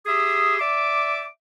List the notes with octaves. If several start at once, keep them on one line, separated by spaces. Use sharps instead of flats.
G4 G#4 E5 C6 D#6
D5 E5 D6